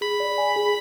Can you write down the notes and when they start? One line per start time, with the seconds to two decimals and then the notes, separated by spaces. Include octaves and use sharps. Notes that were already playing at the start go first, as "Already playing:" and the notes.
0.01 G#4 B5
0.20 D5
0.38 G#5
0.56 G#4